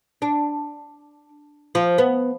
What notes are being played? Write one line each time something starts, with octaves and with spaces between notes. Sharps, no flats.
D4
F3
B3